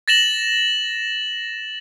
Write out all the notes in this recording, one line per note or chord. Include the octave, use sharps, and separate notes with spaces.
A6 A#6 E7 F#7